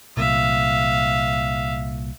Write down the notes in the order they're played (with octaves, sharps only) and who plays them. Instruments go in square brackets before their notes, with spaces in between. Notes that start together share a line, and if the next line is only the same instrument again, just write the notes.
[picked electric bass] C2 A#2 [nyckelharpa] E5 F5